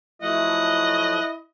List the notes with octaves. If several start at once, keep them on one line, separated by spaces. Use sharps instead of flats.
F3 F#3 A3 E4 D#5 F#5